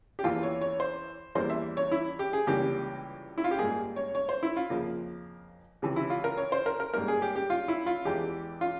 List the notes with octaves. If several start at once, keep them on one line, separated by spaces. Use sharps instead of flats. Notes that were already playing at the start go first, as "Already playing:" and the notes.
G4
E2 E3 A#3 F4
C#5
C#5
C5
E2 E3 G3 A#3 C5
E5
C#5
E4
G4
G#4
C#2 C3 E3 G3 A#3 G4
E4
F4
G4
G#2 G3 A#3 G#4
C#5
C#5
C5
E4
F4
F2 C#3 F3 A#3
C#2 C3 E3
E4
F4
A#4
C#5
C5
A#4
A#4
G#2 G3 A#3 A#4
G#4
G4
G4
F4
E4
F4
E2 E3 G#3 G4
F4